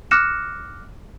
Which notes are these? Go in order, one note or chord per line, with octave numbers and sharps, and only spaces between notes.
D6 F6 F#6 A#6 C#7 E7